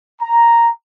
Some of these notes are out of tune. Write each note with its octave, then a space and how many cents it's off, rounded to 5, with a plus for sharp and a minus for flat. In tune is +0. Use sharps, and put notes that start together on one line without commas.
A#5 +0